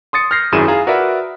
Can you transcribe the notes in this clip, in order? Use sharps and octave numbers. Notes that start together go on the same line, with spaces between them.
C6 D#6 A6 C#7
F6 G6 A#6 C7
G#1 F#2 E4 G#4 D#7 E7
F4 G#4 A#5
F#4 A#4 B4 D5 E5